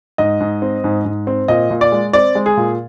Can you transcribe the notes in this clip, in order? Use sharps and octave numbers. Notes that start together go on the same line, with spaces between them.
G#2 D#5
G#2
C4
G#2
G#2
C4
A#2 D#5
A#2
D5
G#3
C4 D5
G#3
G#4
A#2